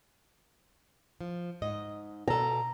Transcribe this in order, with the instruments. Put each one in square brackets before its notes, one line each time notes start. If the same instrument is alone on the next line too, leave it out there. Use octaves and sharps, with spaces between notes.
[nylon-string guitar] F3
G#2 D#5
[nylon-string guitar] B2 A4 [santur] A#5